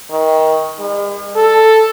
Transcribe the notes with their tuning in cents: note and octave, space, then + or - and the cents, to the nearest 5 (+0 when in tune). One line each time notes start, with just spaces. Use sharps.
D#3 +25
G#3 -45
A4 +5